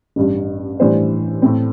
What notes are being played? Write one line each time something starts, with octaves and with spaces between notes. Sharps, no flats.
A1 G2 G3
A2 E3 G3 D4 C5
A2 A3 C4